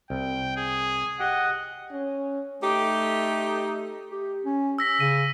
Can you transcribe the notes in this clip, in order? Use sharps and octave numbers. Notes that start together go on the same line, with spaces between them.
C2 G5
G#4
G4 D#5 F#5
C#4
A3 D#4 G4
G4
C#4
E6 A#6 B6
C#3 D#7